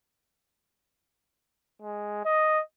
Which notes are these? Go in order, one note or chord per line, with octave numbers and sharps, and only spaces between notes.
G#3
D#5